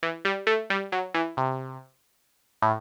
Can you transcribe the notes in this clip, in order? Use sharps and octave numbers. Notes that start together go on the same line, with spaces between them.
E3
G3
A3
G3
F#3
E3
C3
A2